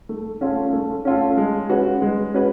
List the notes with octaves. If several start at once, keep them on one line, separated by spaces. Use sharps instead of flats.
A3
C#4 F4 A4
A3
C#4 F4 A4
G#3
C#4 F#4 B4
G#3
C#4 F#4 B4